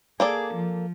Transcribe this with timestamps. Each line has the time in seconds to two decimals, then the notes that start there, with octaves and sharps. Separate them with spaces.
0.20 A#3 G#4 A4 D5
0.54 F3